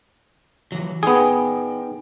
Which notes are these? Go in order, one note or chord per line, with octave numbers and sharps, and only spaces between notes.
E3 F#3
B3 D#4 G#4 D5 G5